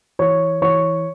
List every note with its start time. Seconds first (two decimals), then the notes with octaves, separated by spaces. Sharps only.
0.19 E3 C#5 C#6
0.62 E3 C#5 C#6